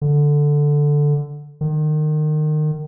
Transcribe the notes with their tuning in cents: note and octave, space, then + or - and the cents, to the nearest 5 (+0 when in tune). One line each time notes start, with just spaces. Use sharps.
D3 +0
D#3 -30